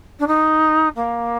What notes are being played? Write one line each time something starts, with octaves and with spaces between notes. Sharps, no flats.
D4
D#4
A#3